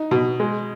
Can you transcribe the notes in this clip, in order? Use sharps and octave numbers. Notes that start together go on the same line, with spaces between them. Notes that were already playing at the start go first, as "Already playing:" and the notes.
Already playing: D#4
B2
G#3